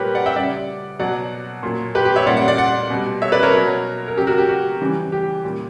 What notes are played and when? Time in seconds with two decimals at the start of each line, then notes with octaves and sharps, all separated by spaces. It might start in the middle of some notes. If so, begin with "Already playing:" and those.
Already playing: A#2 G3 G4 A#4 B4 C#5
0.15 D5 F#5
0.26 E5 G5
0.36 C#3 G3 D5 F#5
0.99 B2 F#3 D5 F#5
1.63 A#2 F#3
1.95 G4 B4
2.05 G4
2.16 C#5 E5
2.26 A#2 G3 D5 F#5
2.37 D5 F#5
2.48 D5 F#5
2.58 D5 F#5
2.90 B2 G3
3.22 C#5 E5
3.32 B4 D5
3.43 A#4 C#5
3.54 B2 F#3
4.08 A#4
4.17 C#3 F#3 G4
4.27 F#4 A#4
4.38 G4
4.49 F#4
4.81 C#3 E3 G3
5.12 G4
5.44 A#2 G3